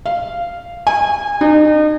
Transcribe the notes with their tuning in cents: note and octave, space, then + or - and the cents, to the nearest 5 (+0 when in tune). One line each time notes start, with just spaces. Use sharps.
F5 -10
G#5 -25
D#4 -35